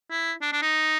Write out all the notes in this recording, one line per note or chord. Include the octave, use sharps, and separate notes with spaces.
E4
D4
D4
D#4